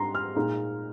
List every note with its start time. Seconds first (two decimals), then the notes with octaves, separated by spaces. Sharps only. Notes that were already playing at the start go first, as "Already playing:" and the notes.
Already playing: G#2 G3 D4 A#5 C6
0.15 F6
0.35 A#2 G#3 D#4